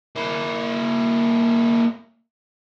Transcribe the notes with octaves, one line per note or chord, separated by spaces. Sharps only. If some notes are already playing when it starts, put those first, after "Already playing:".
A#3 E4